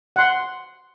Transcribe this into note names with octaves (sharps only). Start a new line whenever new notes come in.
F#5 C6